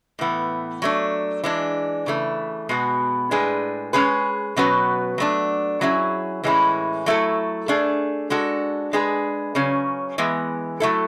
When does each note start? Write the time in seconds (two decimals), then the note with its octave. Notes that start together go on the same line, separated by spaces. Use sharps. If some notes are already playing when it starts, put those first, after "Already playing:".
0.19 A2 E3 B3
0.82 F#3 A3 D4
1.44 E3 G#3 D4
2.06 C#3 E3 A3
2.69 B2 G#3 B3 F#4
3.31 A2 G#3 D4 G#4 B4
3.93 G#3 C#4 G#4 B4
4.56 B2 F#3 C#4 F#4 B4
5.18 F#3 A3 D4
5.81 F#3 C#4 E4 G#4
6.44 A2 E3 G#3 C#4 E4
7.06 F#3 A3 E4 A4
7.68 A3 D4 G#4
8.30 G#3 D4 F#4 A4
8.93 G#3 D4 G#4 B4
9.55 C#3 F#3 C#4
10.18 E3 G#3 B3
10.80 F#3 A3 E4 A4